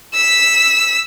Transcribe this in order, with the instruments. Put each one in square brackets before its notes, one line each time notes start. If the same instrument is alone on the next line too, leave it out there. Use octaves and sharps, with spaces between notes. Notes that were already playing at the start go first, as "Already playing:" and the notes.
[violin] E6 B6